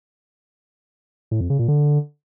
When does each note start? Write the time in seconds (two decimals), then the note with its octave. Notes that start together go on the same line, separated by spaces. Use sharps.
1.31 A2
1.41 F2
1.50 C#3
1.59 A#2
1.68 D3